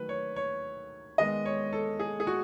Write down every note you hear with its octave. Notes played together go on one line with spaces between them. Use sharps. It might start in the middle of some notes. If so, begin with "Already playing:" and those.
Already playing: D#3 F#3 A3 B4
C#5
C#5
D#3 G#3 B3 D#5
C#5
A4
G#4
G#4
F#4